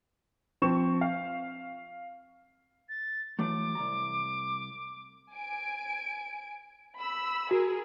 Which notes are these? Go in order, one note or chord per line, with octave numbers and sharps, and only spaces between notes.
F3 C4 C#6 E7
F5
A6
E3 F#3 A3 D6
C2 A#5
G#5 D7
B5 E6
F#4 G#4 A#4